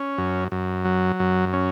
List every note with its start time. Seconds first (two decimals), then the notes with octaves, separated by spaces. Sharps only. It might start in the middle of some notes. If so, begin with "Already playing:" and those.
Already playing: C#4
0.18 F#2
0.52 F#2
0.85 F#3
1.20 F#2
1.53 C#4